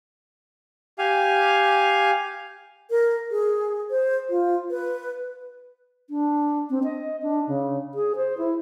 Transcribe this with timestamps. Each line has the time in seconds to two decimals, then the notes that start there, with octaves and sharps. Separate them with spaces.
0.98 G4 F5 G#5
2.91 A#4
3.31 G#4
3.91 C5
4.30 F4
4.70 B4
6.10 D4
6.70 C4
6.84 D#5
7.23 D4
7.47 C#3
7.94 G#4
8.16 C5
8.38 E4